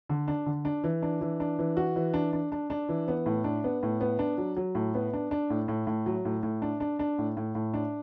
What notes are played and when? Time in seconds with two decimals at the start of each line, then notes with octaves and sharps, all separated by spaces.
0.09 D3
0.28 D4
0.46 D3
0.65 D4
0.84 E3
1.02 D4
1.21 E3
1.40 D4
1.59 E3
1.77 F#4
1.96 E3
2.14 D4
2.33 D4
2.52 D4
2.70 D4
2.89 E3
3.08 B3
3.26 A2
3.44 D4
3.64 B3
3.83 A2
4.01 B3
4.19 D4
4.38 F#3
4.57 F#3
4.75 A2
4.95 B3
5.13 D4
5.31 D4
5.50 A2
5.68 A2
5.87 A2
6.06 F#3
6.25 A2
6.43 A2
6.62 D4
6.80 D4
6.99 D4
7.19 A2
7.37 A2
7.55 A2
7.74 D4